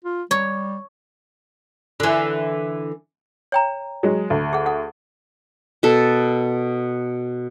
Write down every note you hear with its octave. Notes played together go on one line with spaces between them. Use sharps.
F4
G3 C#5
D3 E3
C#5 G5 A#5
F#3 G#3
D2
G#4 F#5
A4 F#5
B2 A4